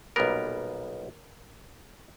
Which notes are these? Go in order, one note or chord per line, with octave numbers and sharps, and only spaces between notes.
B1 A#2 G3 B3 A#4